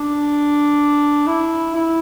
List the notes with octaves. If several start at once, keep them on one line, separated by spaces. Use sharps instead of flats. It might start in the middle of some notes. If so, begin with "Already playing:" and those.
Already playing: D4
E4
E4